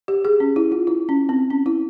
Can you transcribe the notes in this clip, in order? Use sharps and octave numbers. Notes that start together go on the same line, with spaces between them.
G4
G#4
C#4
E4
F4
E4
C#4
C4
C#4
E4